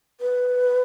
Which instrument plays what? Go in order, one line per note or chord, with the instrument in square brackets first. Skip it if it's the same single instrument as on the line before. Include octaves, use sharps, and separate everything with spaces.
[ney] B4